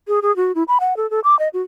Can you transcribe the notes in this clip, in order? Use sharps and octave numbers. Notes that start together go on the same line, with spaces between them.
G#4
G#4
F#4
E4
B5
F#5
A4
A4
D6
D#5
F#4